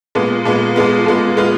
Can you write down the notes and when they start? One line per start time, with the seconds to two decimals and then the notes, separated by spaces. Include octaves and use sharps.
0.15 A#2 G#3 B3
0.45 A#2 G#3 B3
0.76 A#2 G#3 B3
1.06 A#2 G#3 B3
1.37 G#3 B3 F4